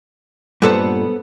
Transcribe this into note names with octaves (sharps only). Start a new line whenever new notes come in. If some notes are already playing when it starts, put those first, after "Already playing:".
G2 A#2 B3 A4 C5